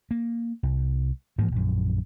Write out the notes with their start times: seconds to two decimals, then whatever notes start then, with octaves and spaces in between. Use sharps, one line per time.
0.11 A#3
0.63 C2
1.38 G#2 E3 F3 A#3
1.52 A#1 F#2